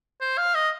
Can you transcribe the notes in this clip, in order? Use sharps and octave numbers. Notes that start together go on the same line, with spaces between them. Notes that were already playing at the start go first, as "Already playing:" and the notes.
C5
F5
D#5